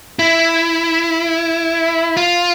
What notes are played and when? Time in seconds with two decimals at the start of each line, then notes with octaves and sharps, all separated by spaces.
0.19 E4
2.17 F4